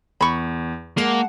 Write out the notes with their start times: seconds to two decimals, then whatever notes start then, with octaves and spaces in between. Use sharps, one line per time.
0.21 E2 B5 C#6
0.97 G#3 A#3 F#5 A5